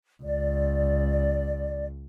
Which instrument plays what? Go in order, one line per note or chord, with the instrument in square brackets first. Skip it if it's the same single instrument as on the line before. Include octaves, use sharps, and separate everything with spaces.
[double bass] C#2 [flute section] D5